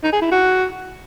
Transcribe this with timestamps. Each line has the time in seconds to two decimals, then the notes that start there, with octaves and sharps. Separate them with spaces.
0.03 D#4
0.13 G#4
0.22 E4
0.31 F#4